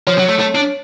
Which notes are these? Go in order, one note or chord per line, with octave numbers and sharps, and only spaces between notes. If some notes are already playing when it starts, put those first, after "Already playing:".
F3 C#5
F#3
A3
A3
D4